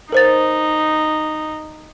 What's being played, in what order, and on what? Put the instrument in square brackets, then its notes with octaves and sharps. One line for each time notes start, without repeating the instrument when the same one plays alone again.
[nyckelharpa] D#4 [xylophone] A#4 C5 A6